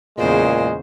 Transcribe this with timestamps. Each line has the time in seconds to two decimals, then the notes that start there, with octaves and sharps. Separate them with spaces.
0.18 E2 A#2 C#3 G#3 C5